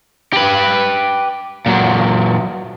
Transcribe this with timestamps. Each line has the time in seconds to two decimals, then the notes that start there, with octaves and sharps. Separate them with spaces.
0.33 G4 B4
1.66 A#2 F#3